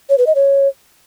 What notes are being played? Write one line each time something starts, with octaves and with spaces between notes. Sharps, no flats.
C#5
B4
D#5
C#5